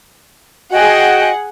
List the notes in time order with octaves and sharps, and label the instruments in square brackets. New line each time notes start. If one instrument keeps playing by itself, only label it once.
[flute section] F#4 D#5 G5 [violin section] G#4 F#5